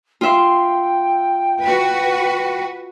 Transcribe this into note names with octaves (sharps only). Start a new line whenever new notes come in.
F4 E5 G5 C6
F#4 B4